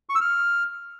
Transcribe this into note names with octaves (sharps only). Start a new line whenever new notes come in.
C#6
E6
F6